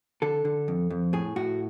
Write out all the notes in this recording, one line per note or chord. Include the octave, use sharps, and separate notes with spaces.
D3 A4
D3
F2
F2
A2 G#4
A2 F#4